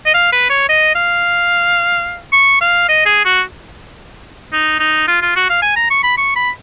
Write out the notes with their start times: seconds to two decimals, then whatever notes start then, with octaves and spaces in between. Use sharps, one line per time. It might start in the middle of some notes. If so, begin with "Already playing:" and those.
0.06 D#5
0.14 F5
0.32 B4
0.49 C#5
0.69 D#5
0.95 F5
2.32 C#6
2.61 F5
2.88 D#5
3.06 G#4
3.25 F#4
4.53 D#4
4.80 D#4
5.08 F4
5.22 F4
5.36 F#4
5.49 F5
5.62 G#5
5.76 A#5
5.90 C#6
6.03 B5
6.17 C#6
6.36 B5